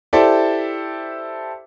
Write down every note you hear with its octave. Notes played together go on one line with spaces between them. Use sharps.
E4 G4 A4 C5 D5 E5